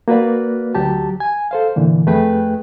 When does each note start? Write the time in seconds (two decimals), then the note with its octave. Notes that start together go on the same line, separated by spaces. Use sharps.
0.08 A#3 F#4 B4 D5
0.75 D2 F#3 G4 A5
1.20 G#5
1.51 A4 C5 F5
1.76 A#2 D3 E3
2.07 F2 A3 G#4 B4 G5